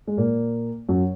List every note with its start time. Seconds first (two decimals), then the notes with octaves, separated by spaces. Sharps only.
0.07 G#3
0.18 A#2 A#3
0.89 F#2 F#3